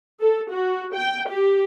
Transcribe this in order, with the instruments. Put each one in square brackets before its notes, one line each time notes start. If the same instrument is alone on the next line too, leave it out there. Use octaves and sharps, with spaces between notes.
[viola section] A4
F#4
G5
G4